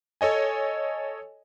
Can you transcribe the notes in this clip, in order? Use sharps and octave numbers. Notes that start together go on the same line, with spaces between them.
A4 C#5 D#5 G#5